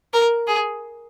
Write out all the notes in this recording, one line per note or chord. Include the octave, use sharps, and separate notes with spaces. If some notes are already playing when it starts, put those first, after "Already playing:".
A#4
G#4